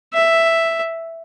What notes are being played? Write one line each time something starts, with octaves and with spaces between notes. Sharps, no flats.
E5